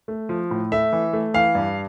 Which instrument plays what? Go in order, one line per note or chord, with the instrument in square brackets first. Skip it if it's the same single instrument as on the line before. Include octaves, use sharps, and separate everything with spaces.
[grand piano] A3
F3
A2
A3 E5
E3
A3
E3 F5
G2